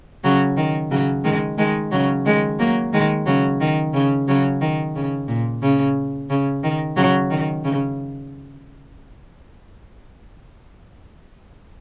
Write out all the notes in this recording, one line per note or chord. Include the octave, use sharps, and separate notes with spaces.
C#3 F#3
D#3
C#3 F#3
D#3 G#3
D#3 G#3
C#3 F#3
D#3 G#3
F#3 A#3
D#3 G#3
C#3 F#3
D#3
C#3
C#3 F#3
D#3
C#3
A#2
C#3
C#3
D#3
C#3 F#3
D#3
C#3